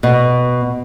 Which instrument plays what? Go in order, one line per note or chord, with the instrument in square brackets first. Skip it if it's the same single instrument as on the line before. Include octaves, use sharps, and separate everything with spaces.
[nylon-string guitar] B2